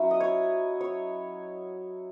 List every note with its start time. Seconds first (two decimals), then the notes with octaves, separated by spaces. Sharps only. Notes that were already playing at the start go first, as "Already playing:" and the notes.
Already playing: F#3 C#4 E4
0.11 D#5
0.20 C#5
0.81 C#5